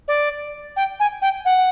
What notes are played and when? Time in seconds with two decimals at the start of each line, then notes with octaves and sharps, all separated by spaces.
0.08 D5
0.76 G5
0.99 G#5
1.22 G5
1.45 F#5